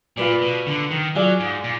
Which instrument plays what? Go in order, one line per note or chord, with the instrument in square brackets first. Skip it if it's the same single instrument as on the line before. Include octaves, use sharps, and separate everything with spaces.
[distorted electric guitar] A#2 [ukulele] F4 B4 D5
[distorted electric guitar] B2
D3
D#3
[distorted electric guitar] F#3 [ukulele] F4 G#4 D5
[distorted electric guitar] G#2
A#2